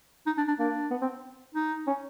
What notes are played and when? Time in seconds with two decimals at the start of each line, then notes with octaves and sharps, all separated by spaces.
0.27 D#4
0.37 D4
0.48 D4
0.59 A#3 D4
0.91 B3
1.02 C4
1.55 D#4
1.87 C#4